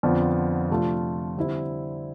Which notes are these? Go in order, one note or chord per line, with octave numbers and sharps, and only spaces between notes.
F2 D3 F3 B3 F4
C3 F3 A3 D4 F4
D3 G3 C4 E4